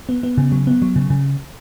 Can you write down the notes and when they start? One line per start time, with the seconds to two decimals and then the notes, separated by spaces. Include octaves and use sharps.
0.09 B3
0.23 B3
0.37 C#3
0.52 F#3
0.67 B3
0.82 F#3
0.96 C#3
1.10 C#3